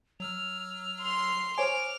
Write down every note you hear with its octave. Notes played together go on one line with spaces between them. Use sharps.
F#3 E6 F6 F7
C6 C7
C5 C#5 G#5 D6 F6 D7 F7